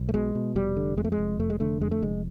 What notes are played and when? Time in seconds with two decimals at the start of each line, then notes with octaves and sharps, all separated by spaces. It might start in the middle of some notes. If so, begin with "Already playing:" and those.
Already playing: B1
0.09 A3
0.14 B2 G#3
0.35 B2
0.55 F1 G3
0.77 D3
0.97 F2 G#3
1.04 A3
1.12 G#3
1.18 F1
1.39 F1 A3
1.50 G#3
1.60 D3 A3
1.81 F2 G#3
1.91 A3
2.02 F1 G#3